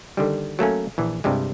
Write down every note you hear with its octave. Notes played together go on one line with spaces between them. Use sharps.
D3 D#3 G3
F#3 A3 A#3 C#4
A#1 E3
C2 G2 C3 G3 G#3